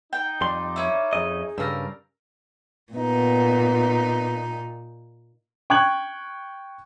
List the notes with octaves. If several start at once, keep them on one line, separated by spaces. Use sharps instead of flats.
D#4 G5
F2 G3 D5 C6
C#4 E4
F2 G#4 D#5
G2 C#3 G3 A#4 E6
A#2 B3 D#4
G5 C#6 F#6 G#6 F#7